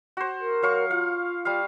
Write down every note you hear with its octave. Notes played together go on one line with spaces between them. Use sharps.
F#4 C5
A#4
F#3 F5 C#6
F4 F5
G3 F5